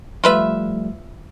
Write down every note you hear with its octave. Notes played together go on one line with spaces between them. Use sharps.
F3 G3 A3 F4 B4 E5